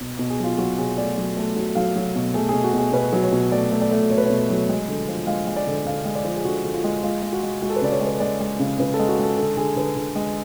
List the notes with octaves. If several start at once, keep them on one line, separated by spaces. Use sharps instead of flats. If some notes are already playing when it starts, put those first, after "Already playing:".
B2
B2
G#4
F#3 F4
F#3 F#4
B2 G#4
A3 D5
F#3
A3
F#3
F#3 F5
F#3
B2
A3 G#4
B2 G#4
F#4
B2 G#4
B2 B4
F#3
C#5
B2
A3 D5
A3
D5
A3
A3 C#5
B4
B2 C#5
F#3
G#3
D3
F3
G#3 F5
G#3
D5
D3
D3 F5
G#3
D5
F3
G#4
D3 F#4
D3
F4
G#3
G#3 F4
G#3
F#4
G#3
G#3 F#4
A4
B4
C#3 D5
C#5
G#3
B4
G#3 D5
G#3
C#3
C#3 B4
A4
G#3
F#4
G#3 A4
D3 A4
D3 G#4
D3 B4
D3
G#3